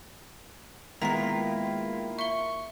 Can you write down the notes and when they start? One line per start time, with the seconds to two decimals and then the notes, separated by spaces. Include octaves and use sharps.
1.02 D#3 G#3 A#3 B3 E4 F4 A#5 B6
2.19 E5 C#6 G7